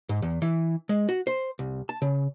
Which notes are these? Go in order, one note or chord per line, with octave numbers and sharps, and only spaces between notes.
G#2
E2
E3
G#3
F#4
C5
C2
A5
C#3